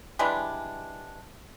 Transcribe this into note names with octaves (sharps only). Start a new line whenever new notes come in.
E3 G3 G#3 D4